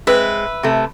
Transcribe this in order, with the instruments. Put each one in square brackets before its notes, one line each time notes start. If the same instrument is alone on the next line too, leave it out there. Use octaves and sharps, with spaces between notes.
[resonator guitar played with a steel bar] G#3 C4 [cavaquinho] B4 E5
[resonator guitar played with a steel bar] C3 A3